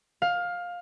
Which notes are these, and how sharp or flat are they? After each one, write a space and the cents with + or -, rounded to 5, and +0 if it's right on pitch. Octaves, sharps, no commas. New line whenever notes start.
F5 +15